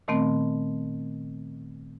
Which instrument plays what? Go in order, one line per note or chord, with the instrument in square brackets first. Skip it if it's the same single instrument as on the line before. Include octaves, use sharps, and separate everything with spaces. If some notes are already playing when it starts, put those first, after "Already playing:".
[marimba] A#2 D#3 A3 B3 C4